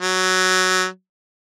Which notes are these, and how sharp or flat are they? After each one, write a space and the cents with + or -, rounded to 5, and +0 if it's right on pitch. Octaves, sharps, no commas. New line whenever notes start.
F#3 +5